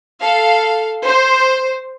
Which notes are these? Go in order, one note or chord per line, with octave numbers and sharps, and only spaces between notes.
A4 F5
C5